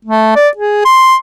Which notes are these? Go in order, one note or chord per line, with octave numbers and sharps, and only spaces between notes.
A3
D5
G#4
C6